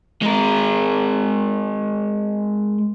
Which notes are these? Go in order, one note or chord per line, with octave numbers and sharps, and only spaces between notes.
G#3 A#4